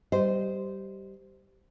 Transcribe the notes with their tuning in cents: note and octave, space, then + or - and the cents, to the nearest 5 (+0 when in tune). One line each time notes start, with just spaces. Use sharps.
G3 -15 C5 -15 D#5 +0